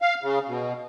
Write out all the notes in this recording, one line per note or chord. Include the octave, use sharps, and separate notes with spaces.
F5
C#3
B2